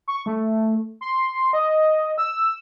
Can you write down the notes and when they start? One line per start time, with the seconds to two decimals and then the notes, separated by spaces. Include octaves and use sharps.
0.08 C#6
0.26 A3
1.01 C6
1.53 D#5
2.18 E6